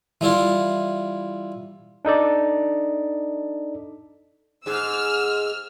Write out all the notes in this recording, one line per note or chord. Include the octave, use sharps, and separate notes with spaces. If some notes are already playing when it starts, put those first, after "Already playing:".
E3 G3 E4 F4
D4 D#4 A4 D5
G#2 G#4 E6 F6